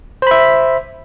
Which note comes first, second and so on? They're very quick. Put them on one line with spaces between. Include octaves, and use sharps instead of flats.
C5 B5 E5